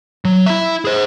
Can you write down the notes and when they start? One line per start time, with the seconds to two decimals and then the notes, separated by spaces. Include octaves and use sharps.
0.25 F#3
0.46 E4 E5
0.85 G#4 C5